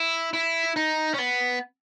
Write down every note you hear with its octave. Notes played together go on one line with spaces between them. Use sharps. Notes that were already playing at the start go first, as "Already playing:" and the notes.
Already playing: E4
E4
D#4
C#4
B3